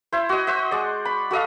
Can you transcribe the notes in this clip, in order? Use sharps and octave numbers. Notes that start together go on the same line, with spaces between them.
E4 C5
F#4 D#5
C5 D#5
G#3 D5
B5
F#4 A4 D#5 F5